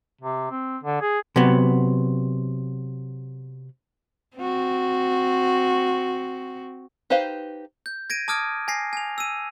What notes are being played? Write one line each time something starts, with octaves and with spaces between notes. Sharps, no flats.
C3
C4
D3
G#4
C3 F#3 B3
C4 F#4
D#4 G4 B4 C5 F5
G6
G#6 A#6 D7 D#7
A5 D6 D#6 F6 G#6 D7
G#5 A#6 C7
G#5 F7
E6 D#7